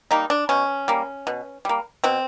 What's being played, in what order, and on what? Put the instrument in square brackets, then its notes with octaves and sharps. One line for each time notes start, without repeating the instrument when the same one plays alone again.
[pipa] G3 A#3 D#4
D4
B2 C#4
G3 A#3
B2
G3 A#3
B2 C4